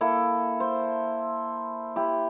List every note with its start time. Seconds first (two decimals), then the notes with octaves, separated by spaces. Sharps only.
0.01 A#3 E4 A4
0.60 C5
1.96 E4 G4